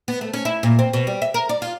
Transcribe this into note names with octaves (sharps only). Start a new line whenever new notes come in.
B3
A3
C#4
E4
A#2
C4
B2
G3
E5
A#4
D5
F4